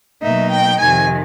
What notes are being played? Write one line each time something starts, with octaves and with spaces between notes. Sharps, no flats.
B2 F#3 A#3 D#4 E5
G5
F2 C3 D#3 G#5